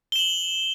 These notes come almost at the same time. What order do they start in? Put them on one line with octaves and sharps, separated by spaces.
G7 E7 F#7